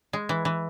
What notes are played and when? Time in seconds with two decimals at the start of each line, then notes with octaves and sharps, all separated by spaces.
0.13 G#3
0.29 E3
0.45 E3